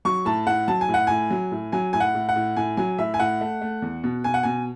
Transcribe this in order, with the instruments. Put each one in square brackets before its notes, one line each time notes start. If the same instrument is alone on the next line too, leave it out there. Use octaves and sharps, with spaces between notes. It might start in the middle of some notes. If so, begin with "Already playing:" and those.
[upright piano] F#3 C#6
A2 A5
A2 F#5
F#3 A5
G#5
A2
F#5
A2 G#5
F#3
A2
F#3 G#5
A2 G#5
F#5
A2
F#5
A2
A2 G#5
F#3 G#5
A2 E5
G#5
A2 F#5
A3
A3
E2
B2
B2 G#5
F#5
B2 G#5